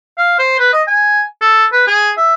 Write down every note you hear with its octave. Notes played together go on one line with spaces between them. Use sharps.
F5
C5
B4
D#5
G#5
A4
B4
G#4
E5